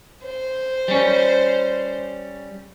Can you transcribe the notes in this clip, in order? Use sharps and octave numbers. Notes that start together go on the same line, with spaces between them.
C5
G3 C#4